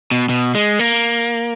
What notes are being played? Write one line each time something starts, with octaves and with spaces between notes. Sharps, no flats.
B2
B2
G#3
A#3